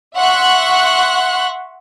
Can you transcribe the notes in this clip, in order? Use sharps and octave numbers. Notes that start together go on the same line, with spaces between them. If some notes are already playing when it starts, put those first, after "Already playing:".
E5 F#5 C6 C#6 F#6